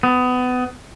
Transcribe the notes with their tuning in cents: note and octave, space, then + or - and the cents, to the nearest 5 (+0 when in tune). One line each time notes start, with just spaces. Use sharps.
B3 +25